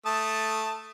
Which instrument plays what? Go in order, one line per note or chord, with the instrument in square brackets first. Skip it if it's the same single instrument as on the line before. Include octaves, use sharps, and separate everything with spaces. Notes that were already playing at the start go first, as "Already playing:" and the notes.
[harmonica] A3 A5 D#6